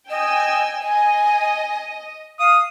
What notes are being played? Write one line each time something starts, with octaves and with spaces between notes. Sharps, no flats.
D#5 G5 G#5 E6
D#5 G#5
F5 D#6